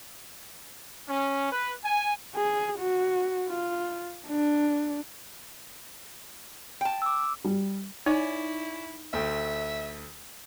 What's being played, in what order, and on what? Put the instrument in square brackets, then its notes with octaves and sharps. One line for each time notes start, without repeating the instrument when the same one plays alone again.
[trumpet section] C#4
B4
G#5
[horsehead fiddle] G#4
F#4
F4
D4
[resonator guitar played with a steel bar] G5 A5
[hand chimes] D6 E6
[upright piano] G3
[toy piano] D#4 [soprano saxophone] E4 [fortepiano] C#5 D5 G#5
[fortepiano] D2 A3 G5 [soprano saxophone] E5